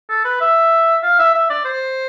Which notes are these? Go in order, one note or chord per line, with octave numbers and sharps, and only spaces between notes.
A4
B4
E5
F5
E5
E5
D5
C5